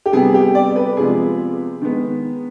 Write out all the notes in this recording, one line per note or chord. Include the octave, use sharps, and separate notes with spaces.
G4
C3 G3 B3 G#4
G4
D5
B4
C3 F3 G#3 B3 G#4
D#3 G#3 B3